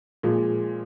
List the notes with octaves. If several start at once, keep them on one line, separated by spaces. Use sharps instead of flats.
A#2 F3 G#3